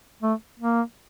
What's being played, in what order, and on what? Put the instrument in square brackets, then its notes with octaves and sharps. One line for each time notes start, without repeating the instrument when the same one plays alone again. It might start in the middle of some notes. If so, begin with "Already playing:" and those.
[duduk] A3
A#3